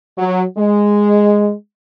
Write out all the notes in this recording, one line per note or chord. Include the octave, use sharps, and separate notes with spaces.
F#3
G#3